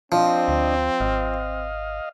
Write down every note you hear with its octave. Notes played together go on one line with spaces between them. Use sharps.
F3 C4 D4 D#5
D2
G#1 D#5 F5